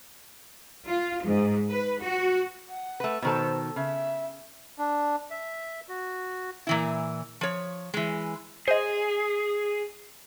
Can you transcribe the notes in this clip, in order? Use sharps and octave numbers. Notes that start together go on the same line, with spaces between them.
F4
G#2
B4
F#4
F#5
A3 B4
B2 D#3 A4 C5
C#3 E5
D4
E5
F#4
A#2 E3 E4
F3 C#5
E3 G#3
G#4 C5 D#5